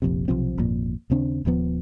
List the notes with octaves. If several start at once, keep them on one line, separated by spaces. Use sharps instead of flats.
F1 A#1 F2 C3
B1 C3 F3 C4
G#1 F2 A#2
D#2 C#3 C4 D4
D#1 D#2 F3 B3